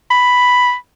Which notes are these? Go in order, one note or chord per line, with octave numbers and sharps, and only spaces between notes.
B5